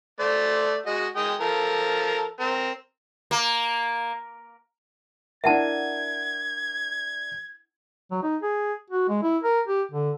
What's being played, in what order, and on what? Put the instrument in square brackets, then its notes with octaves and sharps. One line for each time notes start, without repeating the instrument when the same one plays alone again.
[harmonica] A3 C5 D5
G#3 F#4 D#5
G#3 G5 D#6
F3 A4 A#4
C4 A#4
[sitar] A#3
[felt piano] D4 E4 A#4 [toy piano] E5 F#5 A5 [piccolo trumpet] G#6
[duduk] F#3
D#4
G#4
F#4
G#3
E4
A#4
G4
D3